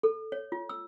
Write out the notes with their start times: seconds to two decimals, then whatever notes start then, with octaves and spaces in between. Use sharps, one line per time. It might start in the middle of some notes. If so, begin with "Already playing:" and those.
0.03 A4
0.32 C#5
0.52 F4
0.69 E6